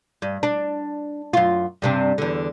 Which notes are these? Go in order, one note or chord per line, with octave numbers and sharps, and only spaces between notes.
G2
D4
F#2 F4
G2 C3 D4
E2 D3